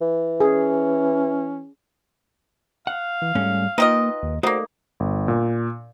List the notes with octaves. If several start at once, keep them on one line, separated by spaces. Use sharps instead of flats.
E3
C#4 G#4
F5 F#5
E3
G#2 G3 A3 C#4
A#3 D#4 F4 B4 D#5 G5
D#2
A3 A#3 D#4 F#4 C5 D5
G1
A#2